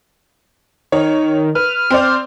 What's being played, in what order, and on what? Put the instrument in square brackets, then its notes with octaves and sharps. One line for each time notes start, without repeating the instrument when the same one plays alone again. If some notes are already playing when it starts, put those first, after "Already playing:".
[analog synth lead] D#3 [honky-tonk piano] C#5
[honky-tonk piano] B4 [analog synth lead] F6
[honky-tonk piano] C4 C5 D5